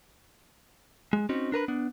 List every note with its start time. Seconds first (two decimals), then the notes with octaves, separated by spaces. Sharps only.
1.13 G#3
1.29 C4 C#4 D#4 F#4
1.52 D4 A#4 B4 B5
1.68 B3 D4